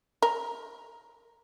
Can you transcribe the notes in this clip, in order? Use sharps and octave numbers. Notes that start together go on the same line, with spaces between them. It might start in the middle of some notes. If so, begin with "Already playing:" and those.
A#4